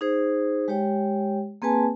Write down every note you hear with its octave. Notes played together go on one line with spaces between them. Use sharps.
D#4 G#4 C5
G#3 G4 C#5 G5
A#3 C4 G#4 B4 G#5 A5